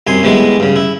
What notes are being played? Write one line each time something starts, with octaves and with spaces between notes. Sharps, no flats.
C2 F#2 G#5 C6
A2 E3 G3 G#3 B3
G2 C#3
E4